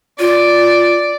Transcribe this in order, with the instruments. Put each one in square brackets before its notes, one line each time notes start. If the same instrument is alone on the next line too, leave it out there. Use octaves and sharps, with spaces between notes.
[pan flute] F4 [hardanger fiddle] D5